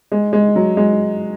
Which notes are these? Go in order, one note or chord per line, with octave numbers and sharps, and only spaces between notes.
G#3
G#3
F#3
G#3